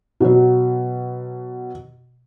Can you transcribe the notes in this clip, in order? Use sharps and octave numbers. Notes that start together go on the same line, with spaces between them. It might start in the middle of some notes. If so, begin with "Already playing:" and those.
B2 F#3